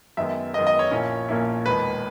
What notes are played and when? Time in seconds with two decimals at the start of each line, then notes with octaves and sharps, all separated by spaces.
0.17 F#2 D#3 G#3 B3 E5
0.54 F#2 D#3 G#3 B3 D#5
0.67 D#5
0.79 C#5
0.91 A#1 A#2 A#3 C#4 E4
1.29 A#1 A#2 A#3 C#4 E4
1.66 E1 D#2 D#3 B4